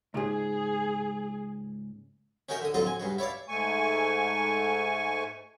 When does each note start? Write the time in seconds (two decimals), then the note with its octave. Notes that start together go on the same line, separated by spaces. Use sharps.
0.14 C#2 G#2 G#4
2.49 C#4 D#4 F#4 A#4 E5 G5
2.62 D3 D#6
2.74 F2 D3 F#3 F4 F#4 D#5
2.87 G#5
3.00 G2 C#3 F#4
3.18 E4 C#5 D5 F5
3.48 G#2 A3 G#5 C#6